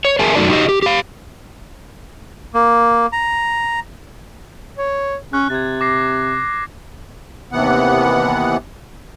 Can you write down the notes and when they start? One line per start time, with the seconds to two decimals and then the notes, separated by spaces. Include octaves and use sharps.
0.05 C#5
0.19 G#4 A#4 E5 G#5 A5
0.35 F#2 A3 D#4 F#4 D5 A5
0.49 D#4 F#4 G4 D#5
0.69 G4
0.82 G4 F5
2.54 A#3
3.12 A#5
4.78 C#5
5.33 C#4 F#6
5.50 C3 G#6 A6
5.81 D6 A#6 C7
7.52 D#2 C3 E3 B3 F#5